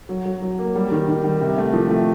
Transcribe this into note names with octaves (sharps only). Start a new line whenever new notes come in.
F#3
F#3
F#3
A#3
G3
D#3
D#3
G3
C3
A3
F3
A3